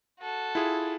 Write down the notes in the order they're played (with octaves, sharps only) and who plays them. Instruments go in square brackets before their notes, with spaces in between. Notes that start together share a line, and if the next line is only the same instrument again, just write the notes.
[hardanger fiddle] F#4 A4
[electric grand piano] E4 F4 G#4